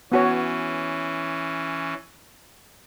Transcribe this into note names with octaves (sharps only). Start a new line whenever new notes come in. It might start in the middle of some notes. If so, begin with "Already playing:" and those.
E3 B3 C#4 F#4 C#5